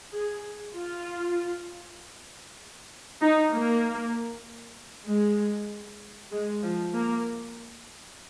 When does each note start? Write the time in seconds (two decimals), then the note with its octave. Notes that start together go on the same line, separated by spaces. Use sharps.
0.12 G#4
0.74 F4
3.22 D#4
3.53 A#3
5.07 G#3
6.32 G#3
6.63 F3
6.94 A#3